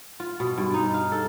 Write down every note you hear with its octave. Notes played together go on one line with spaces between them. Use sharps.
F4
B2
G2
D#4
F5
A4